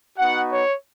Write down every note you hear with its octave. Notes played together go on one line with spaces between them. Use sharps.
B3 D#4 F#4 F#5
C#5